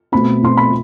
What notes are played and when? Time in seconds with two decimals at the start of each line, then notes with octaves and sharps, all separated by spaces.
0.12 B2 A3 C4 B5
0.42 B2 A3 C4 C6
0.57 B5